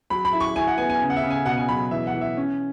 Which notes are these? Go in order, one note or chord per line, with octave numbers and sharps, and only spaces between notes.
F#3 B5
B5
E4
C#6
E4 G#5
F#5
B3 G#5
G#5
C#3
F#5
E5
C#3
G#5
B2 F#5
G#5
F#3 B5
E3 E5
F#5
E3
E5
C#4